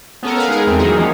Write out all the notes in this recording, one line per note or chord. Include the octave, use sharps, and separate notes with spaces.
B3 C#4 A4 A#4
A#4 B4 F5
G#3 D#4 G#4 A#4
E2 A3 C4
D#3 E3 F#3 D#4 G#4 A#4
F3 A#3 C#4